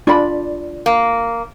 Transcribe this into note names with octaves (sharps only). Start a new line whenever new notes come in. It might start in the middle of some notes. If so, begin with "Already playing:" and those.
D4 F4 D5 B5
A#3